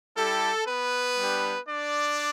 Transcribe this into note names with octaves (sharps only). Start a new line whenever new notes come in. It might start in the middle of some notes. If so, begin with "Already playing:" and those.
G3 E4 G4 A4
B3 B4
G3 D4 G4
D4 D5